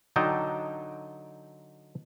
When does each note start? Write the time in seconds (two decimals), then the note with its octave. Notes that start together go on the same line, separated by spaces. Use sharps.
0.16 D3 F#3 D#4 G5 A5